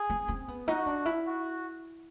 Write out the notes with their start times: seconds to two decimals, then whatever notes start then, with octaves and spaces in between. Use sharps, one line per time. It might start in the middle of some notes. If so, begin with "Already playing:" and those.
Already playing: G#4
0.10 C4
0.28 C4
0.48 B3
0.68 D#4 F#4
0.86 D4
1.06 E4
1.25 F#4